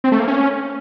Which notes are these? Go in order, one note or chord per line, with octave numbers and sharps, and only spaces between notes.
C4
A3
A#3
C#4